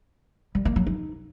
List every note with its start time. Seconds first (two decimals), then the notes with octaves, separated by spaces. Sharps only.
0.55 G3
0.65 A#3
0.76 F#3
0.87 D#4